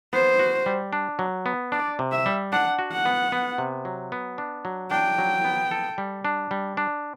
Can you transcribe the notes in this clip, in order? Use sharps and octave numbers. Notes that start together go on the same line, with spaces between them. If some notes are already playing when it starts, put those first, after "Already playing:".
B3 C5
F#4
G3
D4
F#3
B3
D4 D5
C3
E5
G3
D4 F#5
F#4
F#5
B3
B3
C3
F#3
B3
D4
F#3
D4 G5
F#3
B3
A4
G3
D4
G3
D4